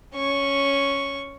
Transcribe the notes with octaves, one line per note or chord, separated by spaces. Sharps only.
C#4 C#6